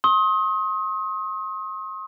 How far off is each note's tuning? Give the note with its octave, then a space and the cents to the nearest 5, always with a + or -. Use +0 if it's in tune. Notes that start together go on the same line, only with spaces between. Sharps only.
C6 +40 D#6 +30